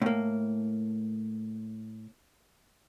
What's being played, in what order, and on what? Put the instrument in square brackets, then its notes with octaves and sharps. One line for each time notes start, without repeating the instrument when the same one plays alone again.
[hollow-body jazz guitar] A2 A#3